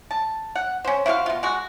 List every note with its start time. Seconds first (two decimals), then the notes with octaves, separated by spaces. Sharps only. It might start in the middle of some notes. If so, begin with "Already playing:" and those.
0.11 A5
0.55 F#5
0.85 C#4 C5
1.06 E4 F#4 C5 F5
1.26 B2 F4
1.43 G#3 F#4